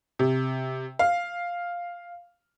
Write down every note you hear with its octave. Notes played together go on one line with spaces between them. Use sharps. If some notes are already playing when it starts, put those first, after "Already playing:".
C3
F5